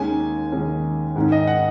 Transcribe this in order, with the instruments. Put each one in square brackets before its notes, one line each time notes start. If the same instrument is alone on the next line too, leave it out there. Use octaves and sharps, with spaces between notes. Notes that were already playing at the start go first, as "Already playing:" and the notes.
Already playing: [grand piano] D#2 D#3 G#3 C#4 G#5
D#2 D#3 G#3 C#4
G#2 D#3 G#3 C#4
D#5
F#5